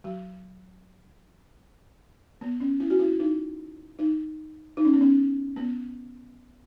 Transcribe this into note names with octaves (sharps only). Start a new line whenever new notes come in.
F#3
B3
C#4
E4
F#4
E4
D#4
D#4
D#4
C#4
B3
C#4
B3